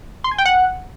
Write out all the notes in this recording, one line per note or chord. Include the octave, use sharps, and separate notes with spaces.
C6
G#5
G5
F#5